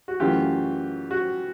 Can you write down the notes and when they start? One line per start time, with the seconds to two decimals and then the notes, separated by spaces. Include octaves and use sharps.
0.08 F#4
0.20 F#2 C#3 E3 A3 F4 G4
1.11 F#4